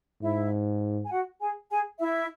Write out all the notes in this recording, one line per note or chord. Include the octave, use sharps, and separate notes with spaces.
G#2 E4 E5
G#5
F#4 F#5
G#4 G#5
G#4 G#5
E4 E5